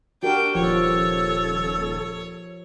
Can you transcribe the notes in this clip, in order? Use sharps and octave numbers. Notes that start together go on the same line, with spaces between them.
D4 F#4 G4 A#4 G5
D#1 F3 A4 C#5